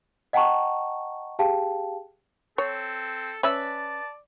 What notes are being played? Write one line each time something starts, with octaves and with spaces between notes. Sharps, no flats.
D#5 F#5 G5 A5 A#5 C#6
G4 G#4 F5 G5 A5
C4 A4 C#5
C#4 B4 D5 E5 A5